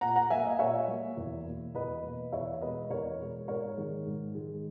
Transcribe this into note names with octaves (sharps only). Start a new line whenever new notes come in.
A#2 F#5 A#5
F#5 A#5
F#3 A#3 E5 G#5
D#5 F#5
A#2 C#5 E5
F#3 A#3
E2
B2 A#3
E2 B4 D#5
B2 A#3
E2 C#5 E5
B2 G#3 B4 D#5
E2 A#4 C#5
B2 G#3
G#2 A#4 C#5
D#3 G#3
G#2
D#3 G#3